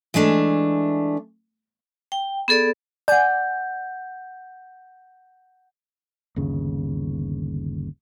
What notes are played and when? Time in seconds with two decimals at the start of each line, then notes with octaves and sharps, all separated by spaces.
0.14 E3 G#3 A3 D4
2.12 G5
2.48 B3 G#4 A4 D5
3.08 D5 F#5 G#5 G6
6.36 G1 D#2 C#3